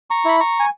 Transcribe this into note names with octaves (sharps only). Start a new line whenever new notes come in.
A#5 C#6
E4 B5
A#5 C#6
G#5